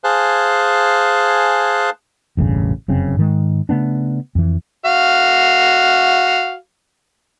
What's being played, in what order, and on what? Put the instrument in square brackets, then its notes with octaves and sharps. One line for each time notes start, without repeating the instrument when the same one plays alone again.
[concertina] G#4 C5 F5 G#5 A5 F#6
[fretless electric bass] E1 A1 G2 C#3
F1 F#2 C#3 C4
G#2 D#3 G#3
C#3 A3 B3 D4
F2 E3
[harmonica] F#4 F5